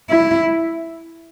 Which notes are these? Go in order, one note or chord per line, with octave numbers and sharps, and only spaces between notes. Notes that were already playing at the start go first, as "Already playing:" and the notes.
E4